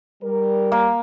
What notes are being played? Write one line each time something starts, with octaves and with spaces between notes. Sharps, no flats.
G3 A#4
A#3